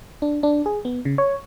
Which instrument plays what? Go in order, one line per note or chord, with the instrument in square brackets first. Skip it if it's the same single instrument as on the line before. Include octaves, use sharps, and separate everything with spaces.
[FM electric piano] D4
D4
G#4
B3
C#3
C#5